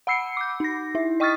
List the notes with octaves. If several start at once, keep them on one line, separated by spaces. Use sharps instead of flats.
F#5 B5 E6 C7 C#7
D6 G6
D#4 A#6
E4 E5
D#5 G5 C#6 D#6 F6 A6